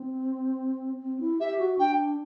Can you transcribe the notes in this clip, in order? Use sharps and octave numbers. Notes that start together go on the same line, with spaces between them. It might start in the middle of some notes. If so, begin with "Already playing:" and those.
Already playing: C4
C4
E4
G4 E5
F#4
D4 G5